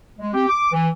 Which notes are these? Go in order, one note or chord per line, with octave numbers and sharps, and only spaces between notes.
G#3
C4 G4
D6
E3